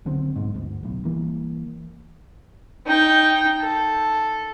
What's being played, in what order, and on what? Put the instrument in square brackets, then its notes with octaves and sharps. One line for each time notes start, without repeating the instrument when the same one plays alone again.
[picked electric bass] B1 D3 C4
B1 G#2
G1 D2
D1 B1
C2 E3 A#3
[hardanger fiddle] D#4 G5
A4